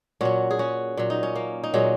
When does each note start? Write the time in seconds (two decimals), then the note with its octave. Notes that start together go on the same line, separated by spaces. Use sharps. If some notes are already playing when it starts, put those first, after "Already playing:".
0.21 A#2 F#3 C#4 F#4
0.51 G#4
0.59 C#4 F#4
0.97 A#2 F#3
1.10 D#4
1.23 C#4
1.35 A#3
1.64 D#4
1.74 A#2 F#3 G#3 C#4